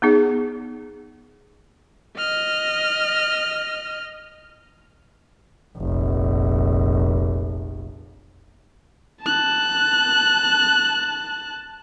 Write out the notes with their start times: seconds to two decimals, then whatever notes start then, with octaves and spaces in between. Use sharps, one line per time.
0.02 B3 D#4 G#4
2.17 D#5 F6
5.78 F1 A#1
9.22 A5 F#6